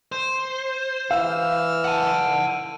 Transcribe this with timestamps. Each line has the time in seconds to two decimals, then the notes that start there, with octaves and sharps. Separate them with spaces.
0.12 C5
1.11 E3 F5 E6 F6
1.84 F#5 A5